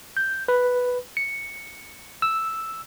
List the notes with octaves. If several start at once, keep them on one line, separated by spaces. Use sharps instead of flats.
G6
B4
C#7
E6